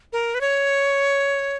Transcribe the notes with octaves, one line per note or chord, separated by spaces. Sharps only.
A#4
B4
C#5